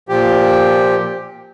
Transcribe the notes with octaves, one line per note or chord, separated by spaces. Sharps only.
A#2 F3 G4